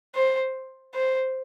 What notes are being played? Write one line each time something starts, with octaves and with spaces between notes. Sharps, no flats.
C5
C5